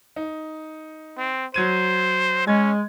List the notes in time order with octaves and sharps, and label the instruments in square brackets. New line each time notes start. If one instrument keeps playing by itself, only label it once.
[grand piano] D#4
[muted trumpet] C4
[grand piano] F#3 G#6 D#7 [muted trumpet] C5
[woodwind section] G#3 [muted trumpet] C#4 [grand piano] G#6